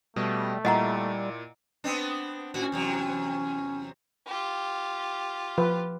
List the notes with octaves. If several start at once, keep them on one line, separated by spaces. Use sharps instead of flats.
B2 G3 A3
A#2 G3 E4 D#5 F#5 A#5
B3 C4 D4
A2 C#4 F#4
E2 C3 F#3
F4 G4
F3 B4